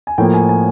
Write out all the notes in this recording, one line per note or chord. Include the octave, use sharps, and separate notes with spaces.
G#5
A2 F3 A#3 G5
G#5
G#5